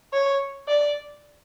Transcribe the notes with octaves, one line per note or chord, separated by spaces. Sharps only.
C#5
D5